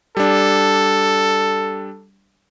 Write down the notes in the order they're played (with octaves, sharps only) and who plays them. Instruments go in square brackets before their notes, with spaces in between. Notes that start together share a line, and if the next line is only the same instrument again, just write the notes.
[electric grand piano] G3 D4 [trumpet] A4